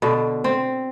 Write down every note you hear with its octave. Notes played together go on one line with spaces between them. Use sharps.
B2 D3
C4